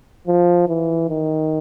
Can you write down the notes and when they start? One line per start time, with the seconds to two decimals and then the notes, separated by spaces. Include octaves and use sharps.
0.27 F3
0.68 E3
1.09 D#3